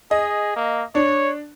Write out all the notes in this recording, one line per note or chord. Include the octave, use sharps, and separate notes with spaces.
G#4 D#5
A#3
D4 C#5